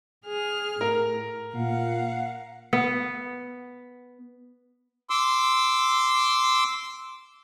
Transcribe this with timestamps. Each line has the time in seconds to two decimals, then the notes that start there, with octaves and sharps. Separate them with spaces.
0.25 G#4 F6
0.81 A2 A#4
1.55 A#2 F5 F#5
2.73 B3
5.10 C6 D6 E6